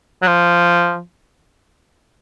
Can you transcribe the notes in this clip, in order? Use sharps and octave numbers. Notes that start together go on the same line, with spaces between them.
F#3
F3